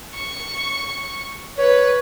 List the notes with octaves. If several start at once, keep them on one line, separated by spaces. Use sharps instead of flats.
C#6
B4 C#5